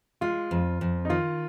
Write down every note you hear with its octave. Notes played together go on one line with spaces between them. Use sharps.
G#3 F4
F2
F2
D#4
D#3 F4